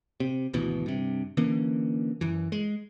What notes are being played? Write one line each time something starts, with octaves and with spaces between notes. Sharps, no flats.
C3
G#1 D2 B2 E3
G2 C3
D3 E3 A#3 C#4
F#2 E3
G#3